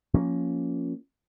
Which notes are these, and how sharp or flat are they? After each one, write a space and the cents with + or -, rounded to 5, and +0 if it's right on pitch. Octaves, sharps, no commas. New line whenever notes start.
F3 +0 A#3 +0 C#4 +5